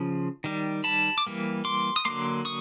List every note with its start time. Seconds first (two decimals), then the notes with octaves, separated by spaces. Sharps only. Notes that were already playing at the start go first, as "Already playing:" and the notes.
Already playing: C#3 F3
0.44 D#3 G3
0.84 A5 B5
1.18 D6
1.27 E3 G3 A#3
1.65 C6 D6
1.96 D#6
2.05 D3 F#3 A#3 C6 D6
2.45 C#6 D#6